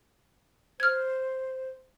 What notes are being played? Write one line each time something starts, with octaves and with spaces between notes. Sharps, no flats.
C5 F6 G#6